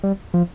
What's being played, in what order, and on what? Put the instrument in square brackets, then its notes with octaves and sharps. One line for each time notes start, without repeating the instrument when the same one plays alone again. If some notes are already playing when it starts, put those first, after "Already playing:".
[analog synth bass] G3
F3